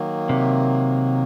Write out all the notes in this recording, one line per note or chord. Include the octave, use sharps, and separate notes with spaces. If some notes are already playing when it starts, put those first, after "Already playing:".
Already playing: D#3 F#3 A#3
C3